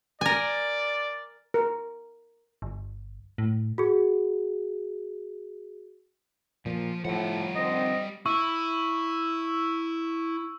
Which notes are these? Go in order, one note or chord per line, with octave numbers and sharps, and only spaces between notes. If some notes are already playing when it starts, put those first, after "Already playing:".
A#4 D5 G#5
A#4
G1
A2
F#4 G#4
A#2 F3
A2 F3 G3 F#5
D3 D#3 C4 D#5
E4 C#6 E6